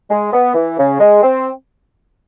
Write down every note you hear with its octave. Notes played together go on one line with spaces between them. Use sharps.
G#3
B3
E3
C#3
G#3
C4